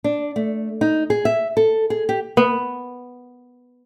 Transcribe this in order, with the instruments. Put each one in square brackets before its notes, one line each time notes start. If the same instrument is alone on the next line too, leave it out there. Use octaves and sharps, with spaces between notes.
[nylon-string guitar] D4
A3
D#4
G#4
E5
A4
G#4
G4
[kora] B3